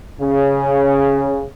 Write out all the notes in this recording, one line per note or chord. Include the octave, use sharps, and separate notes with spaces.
C#3